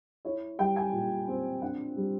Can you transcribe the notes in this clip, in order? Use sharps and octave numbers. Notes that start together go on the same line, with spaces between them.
E4 C#5
G3 G5
G#5
A#2
C4
D4 F#5
G3